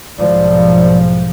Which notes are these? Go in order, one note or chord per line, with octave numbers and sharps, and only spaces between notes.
B1 G#2 F3 D5